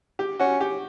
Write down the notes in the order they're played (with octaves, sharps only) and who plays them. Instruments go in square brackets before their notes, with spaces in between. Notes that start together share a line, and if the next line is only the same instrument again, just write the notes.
[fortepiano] G4
[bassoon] C#4 [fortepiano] F#4
[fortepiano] G4